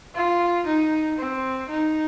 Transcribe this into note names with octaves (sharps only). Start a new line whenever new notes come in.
F4
D#4
C4
D#4